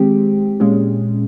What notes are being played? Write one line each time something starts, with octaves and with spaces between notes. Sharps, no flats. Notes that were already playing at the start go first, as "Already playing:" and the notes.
Already playing: D#3 G#3 C4 G4
A#2 G#3 C#4